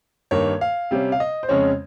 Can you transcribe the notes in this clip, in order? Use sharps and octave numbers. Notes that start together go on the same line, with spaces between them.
G2 D#3 A#3 C#5
F5
C3 G3 C#4
F5
D#5
C5
F2 C#3 G#3 C#4 C#5